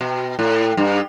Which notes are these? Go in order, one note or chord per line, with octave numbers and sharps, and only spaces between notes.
B2
A2
G2